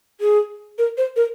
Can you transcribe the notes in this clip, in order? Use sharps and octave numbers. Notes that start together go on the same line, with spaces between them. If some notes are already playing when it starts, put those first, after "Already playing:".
G#4
A#4
C5
A#4